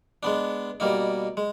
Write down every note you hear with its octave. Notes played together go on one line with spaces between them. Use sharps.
G#3 B3 D4
B2 G3 A#3 D#4
G#3